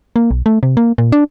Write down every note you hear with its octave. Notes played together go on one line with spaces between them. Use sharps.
A#3
B1
A3
C3
A#3
A#2
D4